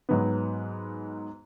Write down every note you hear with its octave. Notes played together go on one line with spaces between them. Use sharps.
G#2 F#3 B3